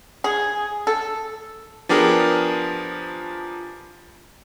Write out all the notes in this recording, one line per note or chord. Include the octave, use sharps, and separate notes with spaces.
G#4
A4
F3 B3 D4 G4 G#4 A#4